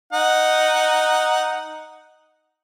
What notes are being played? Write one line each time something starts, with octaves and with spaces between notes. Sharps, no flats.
D#4 F#5